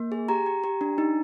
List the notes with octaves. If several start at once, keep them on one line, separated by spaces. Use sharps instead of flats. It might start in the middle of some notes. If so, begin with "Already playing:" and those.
Already playing: A#3
G#4
G4 A#5
G4
G4
D4
D#4